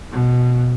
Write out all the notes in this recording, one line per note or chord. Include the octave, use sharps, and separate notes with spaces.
B2